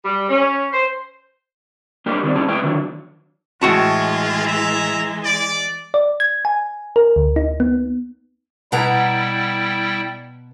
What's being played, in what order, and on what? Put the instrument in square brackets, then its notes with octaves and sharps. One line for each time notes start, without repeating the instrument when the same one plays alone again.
[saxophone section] G3
C#4
C5
[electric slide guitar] G3 A#3 D4 G4
D#3 G3 C4 D5
E3 G3 C#4 G#4 A5
G#3 A3 B4 E5 G5
D3 D#3 F#3
[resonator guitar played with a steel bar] A2 F#4 A5 [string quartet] E3 G#3 [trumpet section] F4
[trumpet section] E5 A#5
D5
[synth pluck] D5
G#6
G#5
A#4
D2
D#4
B3
[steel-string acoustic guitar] B2 F#5 A#5 [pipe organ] G3 E4 G5